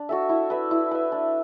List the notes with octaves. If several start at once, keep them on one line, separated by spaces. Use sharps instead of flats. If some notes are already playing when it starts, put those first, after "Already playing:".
Already playing: D4
F#4 A4 E5
E4
B4 E5
E4
B4 E5
D4